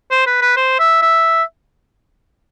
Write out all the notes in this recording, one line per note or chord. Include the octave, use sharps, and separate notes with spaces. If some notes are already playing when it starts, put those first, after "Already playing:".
C5
B4
B4
C5
E5
E5